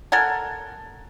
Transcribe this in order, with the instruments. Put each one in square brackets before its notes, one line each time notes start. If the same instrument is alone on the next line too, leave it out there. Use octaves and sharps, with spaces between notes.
[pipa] A4 A#4 F#5 G#5